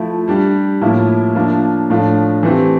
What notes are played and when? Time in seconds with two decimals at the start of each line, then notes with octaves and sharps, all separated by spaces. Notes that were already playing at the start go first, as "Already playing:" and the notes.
Already playing: F3 A3 E4
0.28 G3 D4 G4
0.81 A2 F3 A#3 E4
1.35 F3 A#3 D4 F4
1.90 A2 F3 A3 D4 F4
2.43 E3 A3 C4 G4